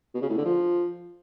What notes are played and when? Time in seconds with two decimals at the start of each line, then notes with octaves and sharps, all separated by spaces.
0.14 B2
0.22 C#3
0.30 A2
0.37 D3
0.45 F3